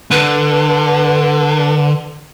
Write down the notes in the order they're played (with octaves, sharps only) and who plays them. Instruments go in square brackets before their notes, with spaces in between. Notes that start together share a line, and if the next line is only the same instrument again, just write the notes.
[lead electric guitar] D3 [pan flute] B4